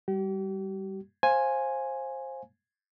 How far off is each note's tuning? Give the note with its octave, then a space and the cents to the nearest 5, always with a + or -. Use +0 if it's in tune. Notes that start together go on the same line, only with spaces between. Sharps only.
G3 +0 G4 -40
C5 +20 F5 +0 G#5 +0